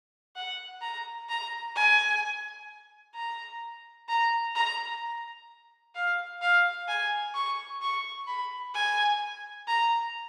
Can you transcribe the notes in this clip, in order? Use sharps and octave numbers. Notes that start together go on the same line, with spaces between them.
F#5
A#5
A#5
G#5
A#5
A#5
A#5
F5
F5
G#5
C#6
C#6
B5
G#5
A#5